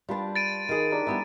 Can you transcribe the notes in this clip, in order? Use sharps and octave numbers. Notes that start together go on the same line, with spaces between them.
G3 D4 F4 B4 A5
A6 D7 D#7
D#3 G#4
D4 G4 A#4
G3 B3 E4 G#4 B4